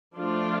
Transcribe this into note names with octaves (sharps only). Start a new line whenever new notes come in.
F3 A3 D4 F4